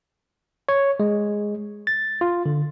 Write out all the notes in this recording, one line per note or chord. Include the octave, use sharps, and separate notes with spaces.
C#5
G#3
A6
F4
D3